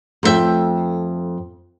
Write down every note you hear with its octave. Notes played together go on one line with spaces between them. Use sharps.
F2 A3 C#4 E5 G5